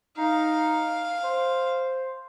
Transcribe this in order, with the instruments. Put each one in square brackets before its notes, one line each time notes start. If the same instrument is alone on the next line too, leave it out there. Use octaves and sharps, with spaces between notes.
[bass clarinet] D#4 [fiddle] F5
[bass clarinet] C5